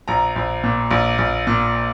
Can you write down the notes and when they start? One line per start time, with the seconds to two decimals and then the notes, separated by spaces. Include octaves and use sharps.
0.08 A#1 A#5
0.36 A#1
0.64 A#2
0.91 A#1
1.18 A#1
1.47 A#2